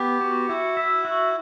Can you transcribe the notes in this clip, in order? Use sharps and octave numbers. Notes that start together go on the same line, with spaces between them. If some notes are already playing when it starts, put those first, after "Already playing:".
Already playing: B3 G4
F#4
E4 F#4
E5
F#4